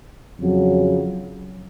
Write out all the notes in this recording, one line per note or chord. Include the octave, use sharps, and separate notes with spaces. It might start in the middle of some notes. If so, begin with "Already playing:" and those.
F2 C#3 F#3